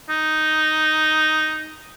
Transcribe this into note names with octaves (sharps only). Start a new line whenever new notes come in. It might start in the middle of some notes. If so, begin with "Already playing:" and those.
D#4